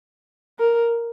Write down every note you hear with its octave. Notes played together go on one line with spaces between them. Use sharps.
A#4